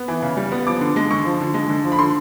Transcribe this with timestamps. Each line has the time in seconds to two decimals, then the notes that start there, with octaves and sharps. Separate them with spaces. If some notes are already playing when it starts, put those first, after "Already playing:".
Already playing: B3
0.08 E3
0.22 C#3
0.37 G3
0.52 B3
0.67 F3 D6
0.81 D3
0.96 G#3
1.10 D3 C#6
1.25 F3
1.41 D3
1.54 G#3
1.69 D3
1.84 F3
1.92 B5
1.99 D3 C6